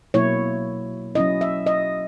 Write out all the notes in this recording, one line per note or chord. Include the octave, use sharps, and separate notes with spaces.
B2 F#3 A#3 E4 C#5
F#3 C#4 E4 D#5
E5
D#5